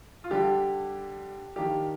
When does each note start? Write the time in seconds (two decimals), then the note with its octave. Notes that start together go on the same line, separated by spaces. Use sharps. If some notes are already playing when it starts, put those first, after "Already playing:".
0.24 F4
0.31 D3 G3 D4 G4
1.56 D#3 A#3 D4 G4